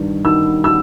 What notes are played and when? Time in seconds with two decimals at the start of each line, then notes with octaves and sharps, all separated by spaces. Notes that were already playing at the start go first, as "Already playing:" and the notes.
Already playing: G2 D#3
0.25 D#3 E6
0.64 E6